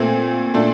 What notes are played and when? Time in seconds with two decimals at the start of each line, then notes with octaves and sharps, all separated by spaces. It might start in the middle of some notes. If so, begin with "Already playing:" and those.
Already playing: A#2 A3 C4
0.54 A#2 A3 D4 A4